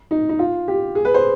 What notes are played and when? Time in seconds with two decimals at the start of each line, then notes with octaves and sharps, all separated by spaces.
0.11 D#4
0.29 D#4
0.39 F4
0.68 G4
0.95 G#4
1.05 B4
1.14 C5